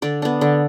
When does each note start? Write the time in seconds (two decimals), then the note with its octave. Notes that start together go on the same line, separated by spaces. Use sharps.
0.02 D3 D5
0.22 B3 D4
0.41 D3